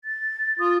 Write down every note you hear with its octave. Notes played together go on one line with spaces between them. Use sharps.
A6
F4 D#6